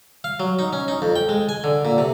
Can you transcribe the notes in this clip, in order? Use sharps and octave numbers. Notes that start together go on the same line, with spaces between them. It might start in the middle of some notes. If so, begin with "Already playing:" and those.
F5
F#3
D#4
C#4
D#4
F2
G5
G#3
G#5
D3
A#2
C3